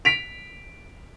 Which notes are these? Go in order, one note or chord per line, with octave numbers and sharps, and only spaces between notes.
B6 D7 F7